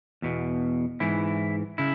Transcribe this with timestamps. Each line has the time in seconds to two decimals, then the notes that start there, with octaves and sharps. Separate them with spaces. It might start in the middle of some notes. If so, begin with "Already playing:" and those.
0.22 E2 B2
1.00 G#2 E3 E4
1.78 C#3 E4